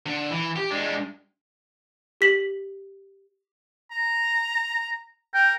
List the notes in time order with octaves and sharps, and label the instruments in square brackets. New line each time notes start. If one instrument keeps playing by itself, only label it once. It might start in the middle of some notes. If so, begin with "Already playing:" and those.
[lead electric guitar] D3
E3
G4
G#3 D4
[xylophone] G4 B6 F#7
[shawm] A#5
[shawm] A#4 [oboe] G5